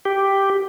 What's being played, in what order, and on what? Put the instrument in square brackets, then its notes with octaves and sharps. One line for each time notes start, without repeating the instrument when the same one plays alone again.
[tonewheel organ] G4